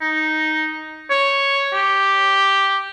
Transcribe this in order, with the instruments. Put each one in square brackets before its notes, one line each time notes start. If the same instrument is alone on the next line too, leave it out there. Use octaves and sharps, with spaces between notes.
[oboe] D#4
C#5
G4